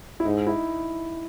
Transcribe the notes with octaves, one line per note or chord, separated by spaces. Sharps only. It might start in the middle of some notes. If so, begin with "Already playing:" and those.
E4
G#2 D#4
E4